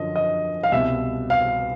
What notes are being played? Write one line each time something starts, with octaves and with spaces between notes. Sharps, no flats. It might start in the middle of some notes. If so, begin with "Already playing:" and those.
Already playing: F#2 D3 F3 D#5
D#5
F5
C2 B2 E5
F5